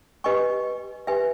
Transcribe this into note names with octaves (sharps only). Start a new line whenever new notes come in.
G4 B4 D#5 G#5 C#6
G4 B4 E5 G#5